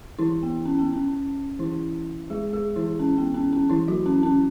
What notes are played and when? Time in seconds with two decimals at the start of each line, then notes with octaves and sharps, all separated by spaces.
0.19 E3 E4
0.43 B3
0.65 C#4
0.79 B3
0.93 C#4
1.59 E3 E4
2.30 G#3 G#4
2.53 G#3 G#4
2.76 E3 E4
2.99 C#4
3.18 B3
3.34 C#4
3.53 C#4
3.70 E3 E4
3.88 F#3 F#4
4.06 C#4
4.23 C#4